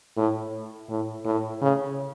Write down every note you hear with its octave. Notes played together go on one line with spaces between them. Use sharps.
A2
A2
A2
C#3